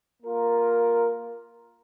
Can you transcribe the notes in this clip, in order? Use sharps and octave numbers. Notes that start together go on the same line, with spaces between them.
A#3 F4 A#4